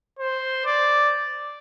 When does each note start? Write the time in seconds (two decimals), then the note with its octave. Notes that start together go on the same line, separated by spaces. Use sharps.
0.19 C5
0.66 D5